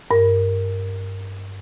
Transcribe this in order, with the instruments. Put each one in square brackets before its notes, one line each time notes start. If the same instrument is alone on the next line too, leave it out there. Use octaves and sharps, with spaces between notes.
[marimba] G2 A#4